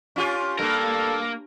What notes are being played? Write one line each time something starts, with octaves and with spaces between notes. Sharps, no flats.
C#4 F4 G4
G2 A#3 A4 A#4